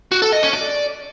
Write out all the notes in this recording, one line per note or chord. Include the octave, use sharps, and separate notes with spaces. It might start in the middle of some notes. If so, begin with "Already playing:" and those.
F#4
A4
D#5
C#4
D5